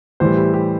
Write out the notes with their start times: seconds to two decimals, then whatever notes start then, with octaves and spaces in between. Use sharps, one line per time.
0.20 A2 E3 G3 C5
0.37 G4
0.54 G4